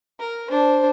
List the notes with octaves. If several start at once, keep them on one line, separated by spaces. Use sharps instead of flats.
A#4
D4 C5